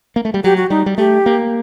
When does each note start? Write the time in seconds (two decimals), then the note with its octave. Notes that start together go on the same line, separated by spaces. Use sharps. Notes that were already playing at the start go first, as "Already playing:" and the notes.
0.16 A#3
0.25 A3
0.34 G3
0.44 F#3 G4
0.57 F#4
0.70 G3 D#4
0.86 G3
0.98 A3 G4
1.26 A#3